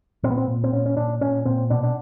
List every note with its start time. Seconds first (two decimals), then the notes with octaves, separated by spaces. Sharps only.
0.23 A#2 C4
0.31 B3
0.38 C4
0.48 A#2
0.64 C4
0.73 A#2 C#4
0.86 C#4
0.97 A#2 D4
1.21 A#2 C#4
1.45 A#2 C4
1.70 B2 D4
1.83 D4